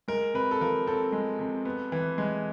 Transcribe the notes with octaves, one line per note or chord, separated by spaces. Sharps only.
G#3 A#4
C3 B4
A4
F3 A#4
C4 A4
G#3
C3
B3
E3
G#3